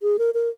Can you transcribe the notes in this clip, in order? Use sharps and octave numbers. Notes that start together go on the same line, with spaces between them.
G#4
A#4
A#4